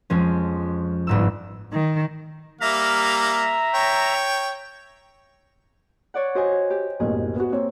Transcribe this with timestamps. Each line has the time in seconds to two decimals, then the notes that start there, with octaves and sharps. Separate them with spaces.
0.10 F2 G#3 C#4
1.07 G1 G#2 E6
1.73 D#3
2.61 G3 A#3 E5 F5 A#5
3.74 C#5 G5
6.14 C#5 D5 F#5
6.35 F#4 C5 D#5 G#5
6.70 G4
7.00 F#1 B1 A2 G#4
7.36 B3 F#4
7.52 A#3 C4 C#5